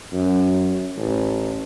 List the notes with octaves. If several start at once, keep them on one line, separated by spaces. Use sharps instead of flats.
F#2
A1